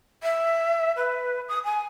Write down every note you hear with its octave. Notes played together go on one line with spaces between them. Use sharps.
E5
B4
D#6
G#5